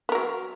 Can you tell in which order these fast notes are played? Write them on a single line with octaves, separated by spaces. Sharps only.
B3 A#4 F#3